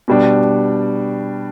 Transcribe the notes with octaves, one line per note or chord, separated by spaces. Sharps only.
B2 G3 D4